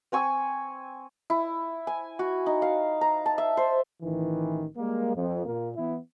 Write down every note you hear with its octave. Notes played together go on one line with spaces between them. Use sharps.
C4 G#5 C#6 E6
E4
G#5
F#4
D#4
F5
A#5
A5
E5
C5
A1 D#3 E3
G3 G#3 A#3
F2
A#2 A#3
E3 B3 E4